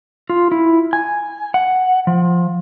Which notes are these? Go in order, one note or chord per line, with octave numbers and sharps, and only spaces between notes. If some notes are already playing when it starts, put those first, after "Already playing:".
F4
E4
G#5
F#5
F3